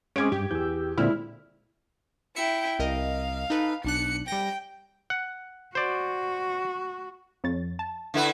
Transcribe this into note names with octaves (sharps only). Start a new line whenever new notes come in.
G#3 C4 C#4 G#4 D6 G#6 D7
G2 G4
E2 E6 G6
A#2 D3 G#3 C4 E4 D5 F6
E4 E5 G5 C#7
C2 A#4 D#5 F5
D#4 A4 B4
B1 D4 F#6 C#7
G3 G5 A#6
F#5
F#4 C5 D5
F2 C#5 A6
A5
D3 E4 B4